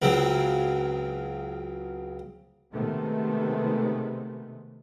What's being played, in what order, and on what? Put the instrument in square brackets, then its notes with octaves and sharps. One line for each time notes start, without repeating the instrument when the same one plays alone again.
[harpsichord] C#2 C#3 F#3 C4
[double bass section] C3 D#3 G#3 A3 B3